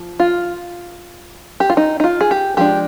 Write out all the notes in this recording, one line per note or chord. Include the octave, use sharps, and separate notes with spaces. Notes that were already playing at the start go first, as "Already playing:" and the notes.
Already playing: F3
F4
G4
F4
D#4
D#4
F4
G#4
G4
F3 G#3 D4 G4